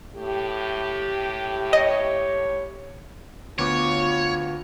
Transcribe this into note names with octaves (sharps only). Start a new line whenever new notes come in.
A2 G4
C#5 D#5
D2 B3 F4 C#5 D6